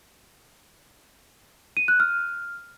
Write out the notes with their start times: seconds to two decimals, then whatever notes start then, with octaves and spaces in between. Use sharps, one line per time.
1.77 D#7
1.88 F#6
2.00 F6